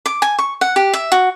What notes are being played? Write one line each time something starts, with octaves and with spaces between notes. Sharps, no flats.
D6
G#5
C#6
F#5
G4
E5
F#4